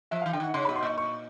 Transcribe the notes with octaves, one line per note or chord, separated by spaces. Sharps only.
F3 E5
F5
E3
D3 G5
D#3 F#5
C#3 C6
B5
B2
C6
A#2 C#6
C#6